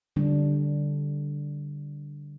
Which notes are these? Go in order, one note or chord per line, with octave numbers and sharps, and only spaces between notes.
D3 G3 D4